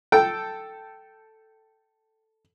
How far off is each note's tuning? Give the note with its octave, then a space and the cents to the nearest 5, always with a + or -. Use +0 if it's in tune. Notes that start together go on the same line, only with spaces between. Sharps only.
A4 +0 G5 -10